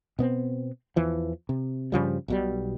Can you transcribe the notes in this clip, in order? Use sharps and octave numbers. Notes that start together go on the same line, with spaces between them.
B2 B3 C4
E2 E3 F3
C3
G2 C#3 F3 G3
B1 B2 G3